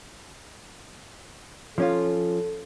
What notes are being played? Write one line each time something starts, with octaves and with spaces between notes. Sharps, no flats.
F3 C#4 F4 A4